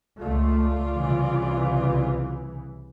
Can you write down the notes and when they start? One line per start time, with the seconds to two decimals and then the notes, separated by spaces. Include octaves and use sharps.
0.20 C#2 A3 F4 D5
0.96 C2 C#3 E3